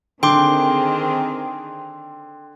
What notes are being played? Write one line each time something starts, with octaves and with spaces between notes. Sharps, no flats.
D3 D#3 C4 G#4 G5 C6 D6